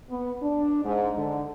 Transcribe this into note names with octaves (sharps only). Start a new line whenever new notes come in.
B3
D4
G#2
D3